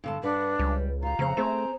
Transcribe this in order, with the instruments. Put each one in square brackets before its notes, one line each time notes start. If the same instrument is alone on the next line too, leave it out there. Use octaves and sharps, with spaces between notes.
[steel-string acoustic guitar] G2 D3 A5
[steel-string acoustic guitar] G2 B4 F#5 [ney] D4
[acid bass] C#2 [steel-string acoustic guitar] G3
[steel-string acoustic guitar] F4 G4 [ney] A#5
[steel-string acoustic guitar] F2 C5 F#5 [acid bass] C#3
[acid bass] A3 [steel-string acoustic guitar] C4 G#4 C5